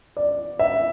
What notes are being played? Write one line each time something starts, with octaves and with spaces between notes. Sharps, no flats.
D5
E5